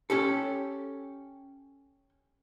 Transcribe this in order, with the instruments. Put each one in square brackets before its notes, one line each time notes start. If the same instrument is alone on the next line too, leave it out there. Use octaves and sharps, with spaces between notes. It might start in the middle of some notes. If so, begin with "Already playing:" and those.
[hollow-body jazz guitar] C#4 G4 A4